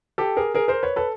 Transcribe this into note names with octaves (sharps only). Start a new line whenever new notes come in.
G4 A4
G#4 A#4
G#4 A#4
A#4 C5
B4 C#5
A4 B4